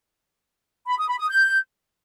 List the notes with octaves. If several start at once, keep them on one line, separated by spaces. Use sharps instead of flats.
B5
D#6
B5
D#6
G6